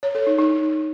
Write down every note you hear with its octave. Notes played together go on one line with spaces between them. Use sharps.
C#5
A4
D#4
D#4